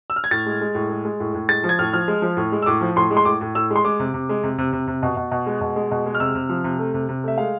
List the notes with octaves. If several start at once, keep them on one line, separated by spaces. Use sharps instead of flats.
E6
F6
G#6
A2 A6
G#3
G#3
A2
G#3
G#3
A2
A2
G#3 A6
F3
G#6
A2 F6
F3 F6
G#3
F3
A2
G#3
E6
A2 D6
F3
A2 C6
G#3
C6
A2 D6
A2
A2 E6
G#3
C6
G#3 D6
C3
C3
G#3
C3
C3
C3
C3
B2
B2
B2
G#3
B2
G#3
B2
G#3
F6
C3 E6
C3
F3
C3
A3
C3
C3
A3 E5
G#3 F5